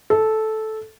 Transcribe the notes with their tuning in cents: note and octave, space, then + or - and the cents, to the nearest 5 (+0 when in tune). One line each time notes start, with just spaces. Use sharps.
A4 -10